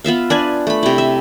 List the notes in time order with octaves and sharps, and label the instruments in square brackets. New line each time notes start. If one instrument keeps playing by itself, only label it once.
[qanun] B3 F4 E5 F5
D4 B4 G#5
A3 B5
C3 E4
E5